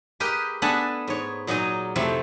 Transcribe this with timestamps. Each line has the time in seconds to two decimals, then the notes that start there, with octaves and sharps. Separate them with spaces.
0.20 G4 G#4 A#4 B4 D#5 G5
0.62 B3 D4 A4 B4 G#5 A5
1.07 G#2 C#5
1.47 A#2 F#3 D#4 G#4 D#5
1.96 F2 C3 A3 C4 E4